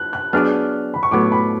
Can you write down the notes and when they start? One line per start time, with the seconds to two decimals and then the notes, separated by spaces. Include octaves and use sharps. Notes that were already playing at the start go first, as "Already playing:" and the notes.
Already playing: F#6
0.13 F#6
0.33 F#3 B3 D4 G#4 D5 F6
0.94 B5
1.03 C#6
1.11 A2 F#3 B3 D6
1.32 B5